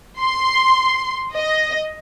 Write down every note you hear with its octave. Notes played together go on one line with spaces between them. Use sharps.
C6
D#5